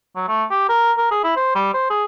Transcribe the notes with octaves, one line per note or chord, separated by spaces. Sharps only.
F#3
A3
G4
A#4
A#4
G#4
E4
C5
G3
C5
G#4